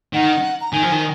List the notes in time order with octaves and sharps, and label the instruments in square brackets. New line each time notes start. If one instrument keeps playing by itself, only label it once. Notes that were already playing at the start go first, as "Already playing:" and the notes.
[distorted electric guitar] D#3 [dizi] F#5
[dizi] A#5
[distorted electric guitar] D#3 [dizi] G#5
[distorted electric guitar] F3
D#3